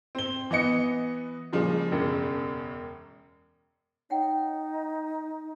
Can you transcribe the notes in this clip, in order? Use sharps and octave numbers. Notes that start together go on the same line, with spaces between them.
C4 G7
E3 B3 D#5 C#7
A#2 C#3 F3 G3 G#3
E1 F#2 C#3
D#4 C#5 F#5 G5